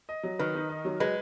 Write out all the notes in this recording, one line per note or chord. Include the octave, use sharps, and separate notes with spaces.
D#5
F#3
D#3 B4
D#4
D#5
F#3
G#3 B4